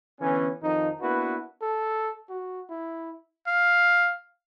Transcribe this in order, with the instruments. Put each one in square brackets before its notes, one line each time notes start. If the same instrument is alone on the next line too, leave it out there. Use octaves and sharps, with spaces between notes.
[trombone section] D3 E3 B3 C#4
F2 D#3 F3 D#4
A#3 B3 D4 E4 F#4 B4
[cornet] A4
F#4
E4
[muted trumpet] F5